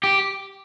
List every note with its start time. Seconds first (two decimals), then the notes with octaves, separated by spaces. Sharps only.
0.03 G4